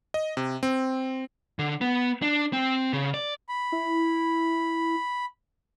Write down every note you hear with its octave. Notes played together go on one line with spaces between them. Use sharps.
D#5
C3
C4
D3
B3
D4
C4
C#3
D5
B5
E4